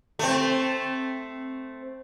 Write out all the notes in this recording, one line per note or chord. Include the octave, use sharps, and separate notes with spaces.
A3 C4